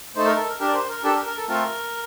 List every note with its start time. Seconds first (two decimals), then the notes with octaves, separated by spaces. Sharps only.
0.16 A3 D#4 A4 C5
0.27 A#4
0.38 A4
0.49 A#4
0.60 D4 G4 A#4
0.68 D5
0.74 C5
0.89 A#4
1.04 D4 G4 A4
1.15 A#4
1.26 A#4
1.37 A4
1.48 A3 C4 F4 A4 A#4